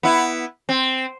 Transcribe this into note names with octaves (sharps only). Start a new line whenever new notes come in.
B3 E4
C4